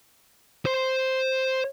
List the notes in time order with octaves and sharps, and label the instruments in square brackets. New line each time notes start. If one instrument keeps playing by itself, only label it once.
[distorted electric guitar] C5 C6